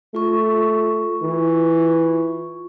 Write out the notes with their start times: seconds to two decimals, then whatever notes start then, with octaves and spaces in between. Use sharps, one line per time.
0.15 A3 F4 C#6
1.22 E3